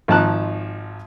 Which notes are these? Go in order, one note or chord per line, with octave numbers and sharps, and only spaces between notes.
G#1 F3 D#4 A5 A#5 F#6